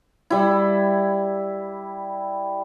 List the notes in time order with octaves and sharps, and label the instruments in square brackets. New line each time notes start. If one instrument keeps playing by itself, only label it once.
[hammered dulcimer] G3 E4